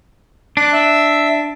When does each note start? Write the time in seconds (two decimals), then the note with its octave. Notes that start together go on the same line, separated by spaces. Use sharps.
0.57 D4 D6 F#6
0.73 E5